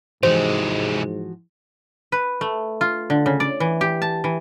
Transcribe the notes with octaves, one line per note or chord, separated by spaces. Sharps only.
G#2 C3 E3 F3 G#3 F#4 C5
B4
A3
F4
D3
C#3
D5
E3
G4
A5
E3